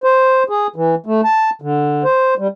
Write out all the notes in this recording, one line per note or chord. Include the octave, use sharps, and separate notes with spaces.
C5
G#4
E3
A3
A5
D3
C5
G3